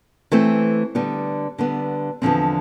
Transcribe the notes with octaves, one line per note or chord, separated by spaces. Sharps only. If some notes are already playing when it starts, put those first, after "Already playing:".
E3 A3 C4
D3 G3 B3
D3 G3 B3
E2 D3 F3 C4